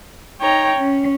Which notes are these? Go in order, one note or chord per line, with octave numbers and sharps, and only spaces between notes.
D#4 C#5 G5 A#5
C#4